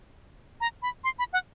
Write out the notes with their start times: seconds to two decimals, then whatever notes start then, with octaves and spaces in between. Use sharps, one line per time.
0.61 A#5
0.82 B5
1.04 C6
1.19 B5
1.33 F#5